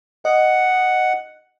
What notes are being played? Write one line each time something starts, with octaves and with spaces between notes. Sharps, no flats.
D#5 F#5